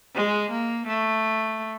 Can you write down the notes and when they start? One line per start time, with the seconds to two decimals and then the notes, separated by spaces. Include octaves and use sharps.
0.15 G#3
0.51 A#3
0.87 A3